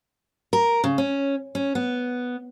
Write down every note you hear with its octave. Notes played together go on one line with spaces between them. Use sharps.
A#4
C#3
C#4
C#4
B3